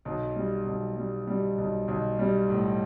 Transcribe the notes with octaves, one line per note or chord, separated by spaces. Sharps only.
B1
G3
B1
G3
G3
B1
B1
G3
A2